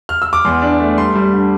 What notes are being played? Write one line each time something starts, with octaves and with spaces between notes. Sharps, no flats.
F6
E6
D6
E2 C6
D4
A3
G3 C6
G3
D3